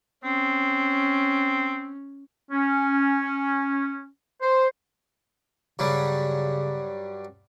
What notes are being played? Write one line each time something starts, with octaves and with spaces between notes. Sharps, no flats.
C4 C#4
C#4
C5
G2 C#3 F#3 G3